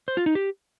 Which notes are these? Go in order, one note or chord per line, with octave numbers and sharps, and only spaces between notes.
C5
F4
D#4
G4